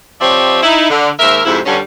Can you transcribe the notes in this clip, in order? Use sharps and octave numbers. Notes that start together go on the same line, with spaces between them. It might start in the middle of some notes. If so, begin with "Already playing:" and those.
F3 C4 G4 C#5 D5 E5
D#4 E4
D3
D#2 G#2 A#3 A#4 E5
F2 G#2 C3 E4
G2 D3 G3 C#4